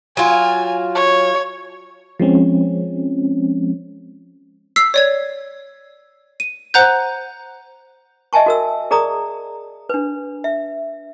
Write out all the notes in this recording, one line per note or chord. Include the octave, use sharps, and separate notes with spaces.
F#3 F4 G#5
C#5
F3 G#3 C4 C#4
E6 B6 C7
C#5 D5 G#6
D#7
C5 F#5 A#5 F#6 G6
D#5 E5 G#5 A5 C#6
F#4 A#4 E6
G#4 A#4 D5 A#5 D#6
D4 B4
E5